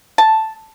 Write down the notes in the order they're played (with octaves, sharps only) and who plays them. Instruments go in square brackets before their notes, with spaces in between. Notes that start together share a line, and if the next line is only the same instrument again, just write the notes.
[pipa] A5